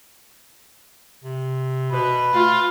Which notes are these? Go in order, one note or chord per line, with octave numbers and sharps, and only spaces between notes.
C3
B2 B4
A3 F4